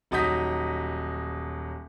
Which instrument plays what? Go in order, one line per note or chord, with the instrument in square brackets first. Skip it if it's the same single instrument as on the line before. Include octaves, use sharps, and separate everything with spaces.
[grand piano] D#1 F#3 D#4 D#6 G6 B6